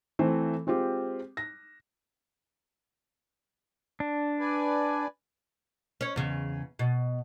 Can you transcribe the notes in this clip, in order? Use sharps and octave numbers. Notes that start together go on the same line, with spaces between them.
E3 A3 C4 C5
G#3 C4 F4 G4
A#6
D4
B4 D5 G#5
C#4 C#5
E2 C#3
B2